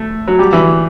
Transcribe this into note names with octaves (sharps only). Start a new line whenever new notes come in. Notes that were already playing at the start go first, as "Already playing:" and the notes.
Already playing: A3
F#3
G3
E3